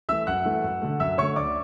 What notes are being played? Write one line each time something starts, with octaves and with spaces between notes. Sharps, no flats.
E3 A3 E5 E6
F#2 F#5 F#6
E3 A3
F#2
D3 A3
F#2 E5 E6
D3 A3 C#5 C#6
D2 D5 D6